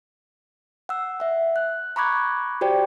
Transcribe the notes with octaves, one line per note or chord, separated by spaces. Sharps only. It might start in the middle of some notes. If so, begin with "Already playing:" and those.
F#5 E6
E5 F#5
F#6
A#5 B5 C#6 D6 F#6 G#6
F#4 G4 C5 D5 G5